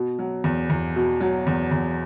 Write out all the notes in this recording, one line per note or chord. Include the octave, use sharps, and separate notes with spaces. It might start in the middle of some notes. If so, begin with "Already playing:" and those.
Already playing: B2
F#3
E2
E2
B2
F#3
E2
E2